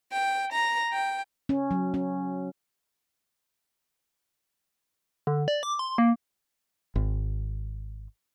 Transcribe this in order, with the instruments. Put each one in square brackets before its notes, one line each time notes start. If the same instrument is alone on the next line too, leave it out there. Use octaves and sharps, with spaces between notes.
[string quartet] G5
A#5
G5
[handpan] C#4
F#3
C#4
[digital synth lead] D3
D5
D6
C6
A#3
[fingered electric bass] G#1